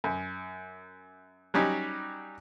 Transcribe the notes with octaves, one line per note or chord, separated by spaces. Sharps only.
F#2
F#3 G3 C#4 D#4 G4